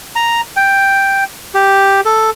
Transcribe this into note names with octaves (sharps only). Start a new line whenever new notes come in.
A#5
G5
G4
A4